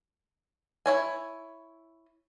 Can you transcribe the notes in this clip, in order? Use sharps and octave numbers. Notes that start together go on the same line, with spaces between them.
E4 C#5 G#5